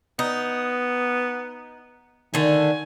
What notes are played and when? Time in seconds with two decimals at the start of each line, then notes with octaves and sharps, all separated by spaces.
0.19 B3 D#4
2.34 D3 D#3 A3 G#5